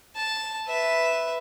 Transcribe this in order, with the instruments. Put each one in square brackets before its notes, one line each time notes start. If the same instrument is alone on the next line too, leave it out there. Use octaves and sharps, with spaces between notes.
[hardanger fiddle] A5
B4 E5